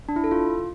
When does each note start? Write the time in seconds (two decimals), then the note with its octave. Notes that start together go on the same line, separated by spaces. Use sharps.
0.09 D4
0.16 E4
0.24 A4
0.31 F4